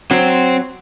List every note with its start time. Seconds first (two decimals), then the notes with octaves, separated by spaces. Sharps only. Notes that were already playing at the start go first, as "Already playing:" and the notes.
0.11 F#3 C4 C5